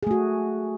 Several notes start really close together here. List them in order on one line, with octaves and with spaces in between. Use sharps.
G#4 A3 F#4